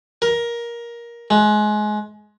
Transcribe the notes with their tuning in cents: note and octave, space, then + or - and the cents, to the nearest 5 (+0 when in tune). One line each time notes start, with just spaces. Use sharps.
A#4 +15
G#3 +25